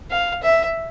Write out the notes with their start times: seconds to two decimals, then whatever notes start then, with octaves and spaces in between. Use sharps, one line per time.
0.11 F5
0.42 E5